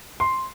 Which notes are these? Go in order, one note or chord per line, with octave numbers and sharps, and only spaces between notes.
C6